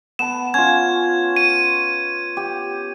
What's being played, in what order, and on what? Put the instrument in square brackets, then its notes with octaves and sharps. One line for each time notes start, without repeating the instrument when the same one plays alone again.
[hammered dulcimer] B3 A5 [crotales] E7
[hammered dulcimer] C#4 F4 [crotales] G#6
[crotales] D#7
[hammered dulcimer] G4